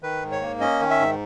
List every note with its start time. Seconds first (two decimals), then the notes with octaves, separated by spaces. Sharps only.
0.03 D#3 B4
0.23 G#2
0.32 C#5
0.41 A#3
0.61 C#4 D#5
0.80 D#3
0.90 E5
1.00 G#2